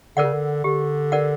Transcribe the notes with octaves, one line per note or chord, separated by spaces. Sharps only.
D3 A#4 D5 F#5
C#3
D3
D3 G4
A#4 D5 F#5